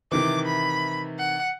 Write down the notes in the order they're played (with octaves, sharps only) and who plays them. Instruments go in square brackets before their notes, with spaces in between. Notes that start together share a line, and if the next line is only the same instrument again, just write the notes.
[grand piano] C3 D#3 E3 [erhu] D6
[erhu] B5
F#5